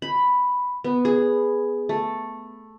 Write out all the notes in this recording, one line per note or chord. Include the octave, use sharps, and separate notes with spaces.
B5
B3
G#4
A3